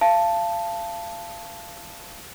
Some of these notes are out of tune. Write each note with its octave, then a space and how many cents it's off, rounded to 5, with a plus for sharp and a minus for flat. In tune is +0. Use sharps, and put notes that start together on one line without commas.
F5 -30 A5 +0